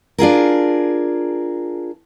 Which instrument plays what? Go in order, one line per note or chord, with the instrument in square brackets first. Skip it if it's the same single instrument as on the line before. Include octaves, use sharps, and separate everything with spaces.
[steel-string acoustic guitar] D4 F4 G#4 A#4